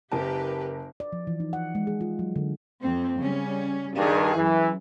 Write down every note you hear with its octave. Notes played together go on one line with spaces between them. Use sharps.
F#1 G4 A#4 B4 A5
D5
F3
E3
D#4
F#5
G#3
G#4
F4
F#3
D3
F2 C4
C#3 G3 C#4
G2 D#3 G#4
F#2 E3